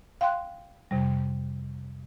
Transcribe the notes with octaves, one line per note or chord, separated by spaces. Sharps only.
F5 G5 C6 F#6
F2 C3 G3